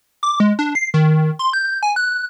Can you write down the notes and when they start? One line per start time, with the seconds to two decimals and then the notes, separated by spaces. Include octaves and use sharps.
0.23 D6
0.40 G#3
0.59 D4
0.75 C7
0.94 D#3
1.39 C6
1.53 G6
1.83 G#5
1.96 F#6